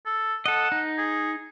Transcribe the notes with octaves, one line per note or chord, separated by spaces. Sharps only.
A4
A4 D#5 F#5
D#4
G#4